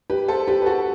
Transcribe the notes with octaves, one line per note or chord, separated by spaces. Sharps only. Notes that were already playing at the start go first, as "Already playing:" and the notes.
G4 B4
A4 C5
G4 B4
B4
F#4 A4